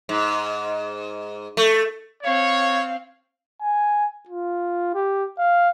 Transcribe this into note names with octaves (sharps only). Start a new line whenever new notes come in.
G#2
A3
C4 C#5 F5
G#5
F4
G4
F5